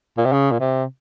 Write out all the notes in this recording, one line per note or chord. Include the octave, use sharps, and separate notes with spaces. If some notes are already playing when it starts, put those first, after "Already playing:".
A#2
C3
C#3
A#2
C3